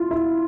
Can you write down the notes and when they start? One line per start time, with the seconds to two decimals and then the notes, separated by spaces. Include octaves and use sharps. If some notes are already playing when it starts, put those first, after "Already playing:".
Already playing: E4 F4
0.11 E4